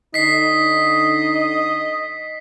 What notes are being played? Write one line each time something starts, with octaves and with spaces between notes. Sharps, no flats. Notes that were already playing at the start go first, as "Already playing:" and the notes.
D3 D#4 D#5 B6 C7